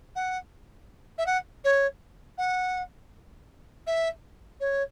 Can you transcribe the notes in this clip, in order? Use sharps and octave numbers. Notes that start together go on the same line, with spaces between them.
F#5
E5
F#5
C#5
F#5
E5
C#5